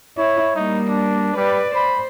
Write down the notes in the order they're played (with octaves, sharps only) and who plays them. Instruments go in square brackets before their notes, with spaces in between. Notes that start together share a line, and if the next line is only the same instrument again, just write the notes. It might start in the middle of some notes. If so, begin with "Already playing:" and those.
[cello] E4 [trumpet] C#5
[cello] G3 A#3 [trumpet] D#4
[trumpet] D4
[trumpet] G3 [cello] B4 D5
[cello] C5 [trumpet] B5